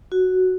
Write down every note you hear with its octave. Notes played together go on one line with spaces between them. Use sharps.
F#4